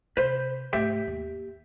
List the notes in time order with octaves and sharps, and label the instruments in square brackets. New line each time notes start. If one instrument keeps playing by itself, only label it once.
[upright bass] C3 [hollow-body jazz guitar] B4 C5
[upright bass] G#2 A3 [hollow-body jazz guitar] G4 E5 G5
[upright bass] D#2